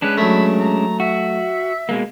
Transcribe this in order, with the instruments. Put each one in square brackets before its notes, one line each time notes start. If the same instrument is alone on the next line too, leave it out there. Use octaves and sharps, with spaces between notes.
[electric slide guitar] G#3 C#4 D4 [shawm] B4
[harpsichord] F#3 A3 [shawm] B5
[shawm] A#5
[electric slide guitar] F#4 [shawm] E5
[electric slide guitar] B2 G#3 A#3